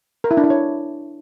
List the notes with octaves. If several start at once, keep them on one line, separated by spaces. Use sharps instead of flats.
A#4
E4
D4
E4
C#5